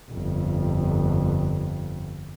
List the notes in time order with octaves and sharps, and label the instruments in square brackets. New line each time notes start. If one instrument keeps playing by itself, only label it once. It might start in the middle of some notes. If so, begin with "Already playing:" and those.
[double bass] G1 F2